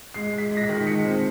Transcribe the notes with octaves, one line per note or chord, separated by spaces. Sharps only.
G#3 C7
G#3
B6
G#3
A#6
B6
D#3
G#3 C#7
C4